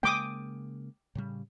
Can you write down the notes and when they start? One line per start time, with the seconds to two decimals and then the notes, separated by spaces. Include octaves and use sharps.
0.03 C#3 G#3 A#3 G5 D6 D#6
1.15 A2 C#3 G3